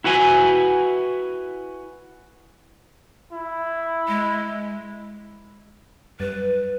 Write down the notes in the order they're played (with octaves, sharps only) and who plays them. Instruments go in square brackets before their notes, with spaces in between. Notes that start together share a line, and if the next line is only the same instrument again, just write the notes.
[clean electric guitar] E4 F#4 B4 G#5
[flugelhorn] E4
[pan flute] G#3
[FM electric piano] F#2 G3 A6 [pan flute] B4